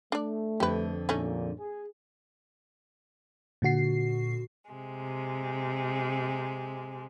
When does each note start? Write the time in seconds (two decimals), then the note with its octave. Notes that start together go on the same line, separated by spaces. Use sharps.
0.12 A3 D4 D5
0.60 F2 D3 G4 B4
1.09 A#1 A#2 A3 C#4 D#4
1.58 G#4
3.62 A#2 D3 F#4 C7
4.70 C3 G#3